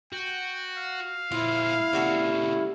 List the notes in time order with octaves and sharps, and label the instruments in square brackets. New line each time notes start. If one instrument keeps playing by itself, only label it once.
[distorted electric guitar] F#4 [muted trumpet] G5
[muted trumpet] F5
[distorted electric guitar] A#2 C4 [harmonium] E4 [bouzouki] F4
[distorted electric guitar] A#2 C#3 [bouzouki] G3 F#4 A4